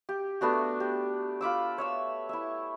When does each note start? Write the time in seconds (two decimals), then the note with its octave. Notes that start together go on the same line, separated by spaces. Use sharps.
0.09 G4
0.41 A3 B3 D4 F#4
0.80 G4
1.41 F4 B5 D6 E6
1.78 C#5 E5 E6
2.29 E4 E5